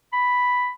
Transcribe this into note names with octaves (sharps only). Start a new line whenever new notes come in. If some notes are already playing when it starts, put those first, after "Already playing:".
B5